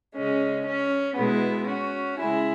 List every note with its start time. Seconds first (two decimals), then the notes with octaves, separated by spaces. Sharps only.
0.15 C#3 G#3 C#4
0.66 C#4
1.17 B2 G#3 B3 E4
1.68 C#4 F#4
2.19 C#3 G#3 E4 G#4